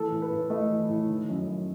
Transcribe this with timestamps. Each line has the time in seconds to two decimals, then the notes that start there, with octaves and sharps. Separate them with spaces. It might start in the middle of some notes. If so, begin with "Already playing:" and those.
Already playing: E3 A3 A4
0.11 A2
0.22 B4
0.31 A2
0.50 A3 D#5
0.70 E3
0.89 A2
1.09 D#3
1.29 F#2
1.48 F#2